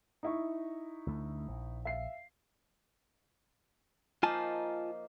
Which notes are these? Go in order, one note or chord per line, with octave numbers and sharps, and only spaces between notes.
D#4 E4 C#6
D2 A3
A#1
E5 F5 C7
F3 A#3 D#4 F4 G#5 A5